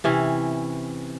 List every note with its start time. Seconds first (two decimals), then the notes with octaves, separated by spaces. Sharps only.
0.04 C3 E3 C#4